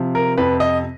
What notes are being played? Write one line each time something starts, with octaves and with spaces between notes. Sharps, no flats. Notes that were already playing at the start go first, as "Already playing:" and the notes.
Already playing: C3 F3
A#4
F2 B4
D#5